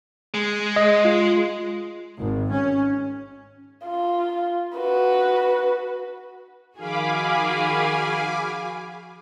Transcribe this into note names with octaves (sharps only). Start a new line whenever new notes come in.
G#3
D#5
F4
G#1
C#4
F4
F#4 B4
D#3 F3 F#4 G#4 F5 G#5 B5 D6